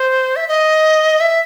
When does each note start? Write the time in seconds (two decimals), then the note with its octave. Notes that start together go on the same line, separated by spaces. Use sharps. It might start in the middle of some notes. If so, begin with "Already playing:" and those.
Already playing: C5
0.36 E5
0.48 D#5
1.20 E5